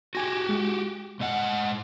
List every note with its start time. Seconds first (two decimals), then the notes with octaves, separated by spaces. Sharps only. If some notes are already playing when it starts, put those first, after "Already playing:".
0.15 F#4 G4 G#5 A#6
0.49 G#3
1.20 G#2 D#5 F#5